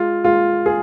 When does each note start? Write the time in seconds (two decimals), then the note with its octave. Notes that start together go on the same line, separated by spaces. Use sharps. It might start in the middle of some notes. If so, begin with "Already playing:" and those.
Already playing: G#3 F4
0.24 G#3 F4
0.66 G#4